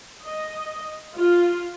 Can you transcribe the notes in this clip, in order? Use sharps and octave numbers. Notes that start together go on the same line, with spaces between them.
D#5
F4